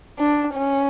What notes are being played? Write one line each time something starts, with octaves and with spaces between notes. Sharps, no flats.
D4
C#4